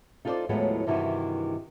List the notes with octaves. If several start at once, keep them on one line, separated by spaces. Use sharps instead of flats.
D#4 F4 A4 A#4 C5 D5
D#2 A2 F3 F#3 G#3 B3
G2 C3 D#3 E3 E4 F#4